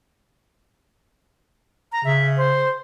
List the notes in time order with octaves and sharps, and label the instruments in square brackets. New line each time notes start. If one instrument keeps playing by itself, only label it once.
[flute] A#5
[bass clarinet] C#3 [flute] E5
[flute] C5